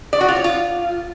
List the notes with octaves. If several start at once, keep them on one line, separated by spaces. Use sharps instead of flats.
D5
F#4
F4
C#5
F4